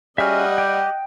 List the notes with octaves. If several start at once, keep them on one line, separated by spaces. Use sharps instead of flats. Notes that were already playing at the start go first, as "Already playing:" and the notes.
G3 C#4 F#4 G#4 D#5 E5 F#5 F6
G4 G5